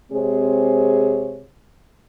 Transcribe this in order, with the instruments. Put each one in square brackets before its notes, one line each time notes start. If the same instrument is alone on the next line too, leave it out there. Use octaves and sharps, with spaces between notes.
[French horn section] C3 G#3 C4 G#4 C5 C#5